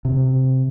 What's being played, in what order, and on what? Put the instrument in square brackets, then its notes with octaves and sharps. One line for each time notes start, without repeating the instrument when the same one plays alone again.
[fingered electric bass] C3